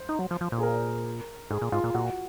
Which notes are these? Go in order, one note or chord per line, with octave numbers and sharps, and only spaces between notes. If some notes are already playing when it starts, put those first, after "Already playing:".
Already playing: C5
D#4
F#3
F3
F3
A#2
G#4
A#4
G#2 G#4
A#2
G#2 F4
A#2
A#2 F#4